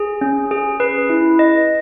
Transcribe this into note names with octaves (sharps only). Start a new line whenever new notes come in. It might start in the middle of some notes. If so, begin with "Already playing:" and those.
Already playing: G#4
C#4
G#4
B4
E4
D#5